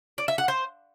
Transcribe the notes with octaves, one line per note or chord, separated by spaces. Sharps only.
D5
E5
F#5
C5